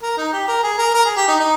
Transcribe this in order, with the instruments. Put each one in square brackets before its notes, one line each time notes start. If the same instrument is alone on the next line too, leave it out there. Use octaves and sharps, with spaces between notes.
[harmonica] A#4
D#4
G4
A#4
G#4
A#4
A#4
G#4
G4
D#4
D#4